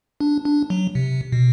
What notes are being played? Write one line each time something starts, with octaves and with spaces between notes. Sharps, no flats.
D4
D4
F#3
C3
B2